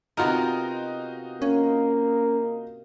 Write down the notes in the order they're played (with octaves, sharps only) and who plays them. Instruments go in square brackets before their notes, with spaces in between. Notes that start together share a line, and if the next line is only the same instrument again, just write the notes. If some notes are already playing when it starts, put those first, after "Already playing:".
[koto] C3 B3 A#4 [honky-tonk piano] D#4 F4 F#4
[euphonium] A#3 [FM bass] C#4